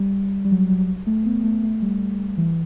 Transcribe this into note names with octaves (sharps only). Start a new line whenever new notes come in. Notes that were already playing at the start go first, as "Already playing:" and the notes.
Already playing: G3
G3
F#3
F#3
A3
B3
A3
A3
G3
E3